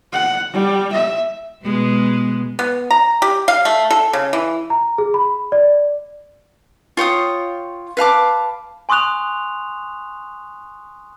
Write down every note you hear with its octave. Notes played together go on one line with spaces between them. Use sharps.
F#5
G3
E5
B2 G#3 B3
B3
A#5
G4
F5
A3
A4
C#3
E3
A#5
G#4
B5
D5
F4 C#5 G5 D#6
B4 F5 A5 D6
G#5 C6 C#6 D#6 F#6 F7